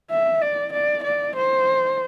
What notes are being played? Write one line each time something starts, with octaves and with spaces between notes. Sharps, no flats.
E5
D5
D5
D5
C5